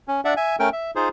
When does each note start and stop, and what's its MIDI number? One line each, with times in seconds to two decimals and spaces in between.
0.08 0.21 61
0.25 0.34 62
0.25 0.34 74
0.25 0.34 76
0.25 0.34 78
0.37 0.56 76
0.37 0.56 80
0.59 0.69 57
0.59 0.69 61
0.59 0.69 70
0.59 0.69 79
0.73 0.91 76
0.96 1.09 63
0.96 1.09 65
0.96 1.09 68
0.96 1.09 72